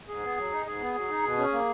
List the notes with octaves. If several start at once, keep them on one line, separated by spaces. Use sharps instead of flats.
G#2 G#4
B3
F#3
D#4
G#2 G#4
B3
F#3
D#4
B2
C#4
A#3